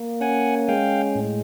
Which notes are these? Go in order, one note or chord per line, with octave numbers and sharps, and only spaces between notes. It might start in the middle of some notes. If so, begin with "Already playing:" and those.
Already playing: A#3
C#4 F#5 G#5
G#3 F5 G5
A2